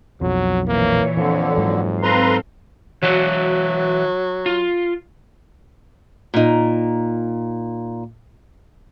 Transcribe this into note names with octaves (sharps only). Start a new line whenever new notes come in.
B1 F2 F#3
A#2 E3 A#3 C#5
F2 D3 F3
G#2 F#3
C4 A4 B4 F5 A#5 C6
E3 F#3 F#4
F4
A#2 D#4